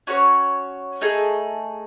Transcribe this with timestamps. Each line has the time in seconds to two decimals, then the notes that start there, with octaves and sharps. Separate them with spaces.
0.07 C#4 F#4 C#5
1.01 A3 D#4 G#4